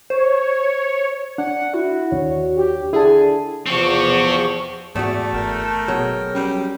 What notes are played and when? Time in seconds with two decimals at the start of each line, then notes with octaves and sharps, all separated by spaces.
0.10 C5 C#5
1.38 D4 F#5
1.74 E4 F#4
2.12 D#2 D4 C#5
2.57 G4
2.93 D3 E4 G#4 A5
3.66 E2 F3 C4 G4 C#6
4.95 E2 G#2 A3 F#4 G4 D5
5.33 G1 A#4 G5
5.88 B2 F#3 G#3
6.35 G3 C#4